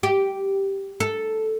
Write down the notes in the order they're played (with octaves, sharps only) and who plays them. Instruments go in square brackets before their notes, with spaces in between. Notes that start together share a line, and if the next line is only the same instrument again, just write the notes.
[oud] G4
A4